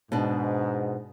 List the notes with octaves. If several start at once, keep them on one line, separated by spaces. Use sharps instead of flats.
G#2 B2 D4